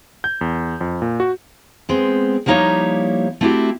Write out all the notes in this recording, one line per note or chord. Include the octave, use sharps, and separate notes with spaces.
G6
E2
F2
A#2
F#4
G#3 B3 C4
F3 G3 A#3 D#4 E4 C#5
A3 C4 E4 F#4 G4